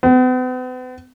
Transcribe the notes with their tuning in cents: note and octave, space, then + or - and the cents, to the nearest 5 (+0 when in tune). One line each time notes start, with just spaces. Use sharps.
B3 +45